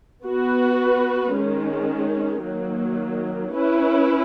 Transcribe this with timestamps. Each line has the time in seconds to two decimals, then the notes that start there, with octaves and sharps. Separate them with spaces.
0.24 B3 F#4 B4
1.34 D#3 G#3 C#4
2.44 D#3 F#3 A#3
3.54 C#4 E4 B4